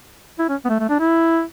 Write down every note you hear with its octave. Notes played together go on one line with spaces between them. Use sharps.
E4
C#4
B3
A3
A3
D4
E4